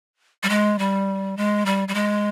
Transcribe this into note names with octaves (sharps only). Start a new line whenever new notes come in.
G3
G#3
G3
G#3
G3
G3
G#3